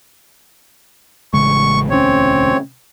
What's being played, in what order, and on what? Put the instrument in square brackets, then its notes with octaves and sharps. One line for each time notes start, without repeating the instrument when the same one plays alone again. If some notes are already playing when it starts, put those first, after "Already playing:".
[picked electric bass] A1 C#3 G#3 [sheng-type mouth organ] C#6
[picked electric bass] E1 D2 C#4 [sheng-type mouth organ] C4 C#5